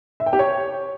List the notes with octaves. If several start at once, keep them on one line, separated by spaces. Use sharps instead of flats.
E5
G5
G4
C#5